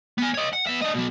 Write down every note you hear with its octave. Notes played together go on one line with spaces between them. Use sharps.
B3 G#5
C#5 D#5
F#5
B3 E5
D4 D#5
B2 F#3